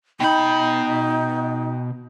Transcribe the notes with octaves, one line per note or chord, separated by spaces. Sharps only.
B2 D#4 G5 B5 G6